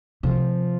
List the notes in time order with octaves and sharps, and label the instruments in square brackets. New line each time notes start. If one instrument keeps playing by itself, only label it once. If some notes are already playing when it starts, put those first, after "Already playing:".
[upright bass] C3 [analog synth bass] F3